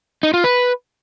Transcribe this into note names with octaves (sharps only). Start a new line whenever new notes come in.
D#4
F4
B4